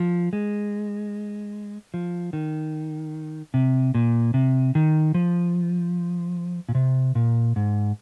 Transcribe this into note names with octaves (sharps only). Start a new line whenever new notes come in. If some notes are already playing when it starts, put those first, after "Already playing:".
Already playing: F3
G#3
F3
D#3
C3
A#2
C3
D#3
F3
A#2
C3
A#2
G#2